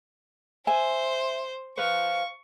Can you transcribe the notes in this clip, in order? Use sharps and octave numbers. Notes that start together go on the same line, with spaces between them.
C5 E5 G#5
B4 C5 F5 C#6